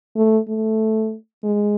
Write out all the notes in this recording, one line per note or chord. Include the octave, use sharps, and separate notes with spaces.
A3
A3
G#3